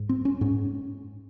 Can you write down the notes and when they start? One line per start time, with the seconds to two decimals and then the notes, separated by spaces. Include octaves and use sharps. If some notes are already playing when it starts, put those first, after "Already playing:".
Already playing: G#2
0.09 C4
0.25 C#4
0.41 G#2 C#4